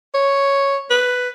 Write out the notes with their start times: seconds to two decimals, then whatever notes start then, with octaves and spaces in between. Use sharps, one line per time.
0.14 C#5
0.90 B4